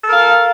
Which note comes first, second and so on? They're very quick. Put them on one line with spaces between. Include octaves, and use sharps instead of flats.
A4 A#4 F5